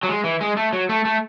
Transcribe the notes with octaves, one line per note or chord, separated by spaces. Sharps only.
F#3
G#3
E3
G#3
A3
F#3
A3
A3